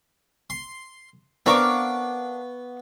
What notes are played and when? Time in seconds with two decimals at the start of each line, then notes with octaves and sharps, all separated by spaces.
0.50 C6
1.46 B3 C4 D4 A#4 F5 C#6 D6